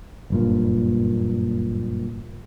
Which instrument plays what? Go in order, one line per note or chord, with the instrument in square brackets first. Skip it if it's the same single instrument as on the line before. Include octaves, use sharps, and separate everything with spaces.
[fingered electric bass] F#1 G2 A#2